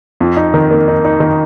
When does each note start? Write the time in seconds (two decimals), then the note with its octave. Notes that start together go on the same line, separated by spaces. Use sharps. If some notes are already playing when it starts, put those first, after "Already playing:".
0.20 F2
0.37 D#4
0.54 D#3
0.71 A#3
0.88 D#4
1.04 D#4
1.20 D#3